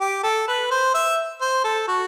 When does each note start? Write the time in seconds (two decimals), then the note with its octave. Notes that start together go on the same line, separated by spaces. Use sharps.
0.01 G4
0.24 A4
0.48 B4
0.71 C5
0.94 E5
1.41 C5
1.64 A4
1.88 F#4